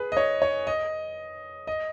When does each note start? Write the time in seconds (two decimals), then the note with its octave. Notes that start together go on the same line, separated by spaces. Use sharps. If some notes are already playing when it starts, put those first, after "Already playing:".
Already playing: G#4 B4
0.12 D#5
0.17 C#5
0.42 C#5
0.67 D#5
1.67 D#5